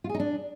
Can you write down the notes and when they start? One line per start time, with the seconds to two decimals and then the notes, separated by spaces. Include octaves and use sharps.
0.04 F4
0.09 G#4
0.15 D#4
0.20 D4